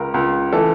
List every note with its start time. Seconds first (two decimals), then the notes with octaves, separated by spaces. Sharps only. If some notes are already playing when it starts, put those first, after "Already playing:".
Already playing: C#2 A#4
0.14 C#2
0.53 E3 A4